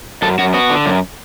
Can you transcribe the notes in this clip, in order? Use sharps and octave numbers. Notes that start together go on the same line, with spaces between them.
F#2 A4
F#2 F#4
B3 F#4
D3
F#2